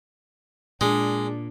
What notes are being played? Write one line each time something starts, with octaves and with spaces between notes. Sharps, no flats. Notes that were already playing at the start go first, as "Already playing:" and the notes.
A#2 G#3 D4